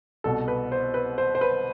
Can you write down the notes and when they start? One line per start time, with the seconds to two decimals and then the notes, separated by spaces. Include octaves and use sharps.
0.24 C2 B2 A4
0.48 B4
0.72 C5
0.94 B4
1.18 C5
1.35 C5
1.41 B4